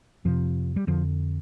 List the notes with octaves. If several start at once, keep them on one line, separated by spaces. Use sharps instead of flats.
F2 C3 F3
G3
F2 D3 F3